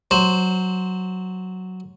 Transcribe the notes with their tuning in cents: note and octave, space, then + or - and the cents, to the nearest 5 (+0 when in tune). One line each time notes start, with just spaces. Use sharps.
F#3 +0 C5 +0